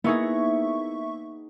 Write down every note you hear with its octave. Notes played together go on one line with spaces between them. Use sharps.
A#3 B3 D#4 E4 G#4 E5 C#6